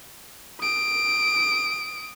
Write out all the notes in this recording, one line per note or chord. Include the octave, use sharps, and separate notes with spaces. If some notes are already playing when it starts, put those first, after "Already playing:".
D#6 D7